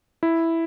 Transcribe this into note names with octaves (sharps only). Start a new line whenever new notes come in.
E4